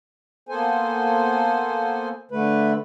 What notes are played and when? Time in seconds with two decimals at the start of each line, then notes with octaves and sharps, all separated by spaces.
0.49 A#3 B3 A4 C5 G#5
2.31 D3 A3 B4